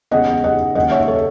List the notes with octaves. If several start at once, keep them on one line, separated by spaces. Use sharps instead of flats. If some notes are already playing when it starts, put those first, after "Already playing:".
E2 C#3 G#3 D#5 F#5
D#5 F#5
D#2 C#3 G#3 D#5 F#5
C#5 E5
A4 C#5